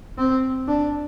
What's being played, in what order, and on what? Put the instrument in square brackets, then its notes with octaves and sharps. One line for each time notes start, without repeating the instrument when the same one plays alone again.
[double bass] C4
D4